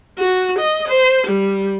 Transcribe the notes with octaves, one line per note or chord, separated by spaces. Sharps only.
F#4
D#5
C5
G3